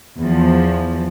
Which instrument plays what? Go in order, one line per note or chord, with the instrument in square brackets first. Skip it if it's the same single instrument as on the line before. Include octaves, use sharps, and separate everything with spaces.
[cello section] E2 F3